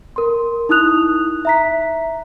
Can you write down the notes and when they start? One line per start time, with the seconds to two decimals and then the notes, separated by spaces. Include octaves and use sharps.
0.16 A#4 C6
0.69 D#4 E4 D#6 F#6 F7
1.45 E5 A#5 B6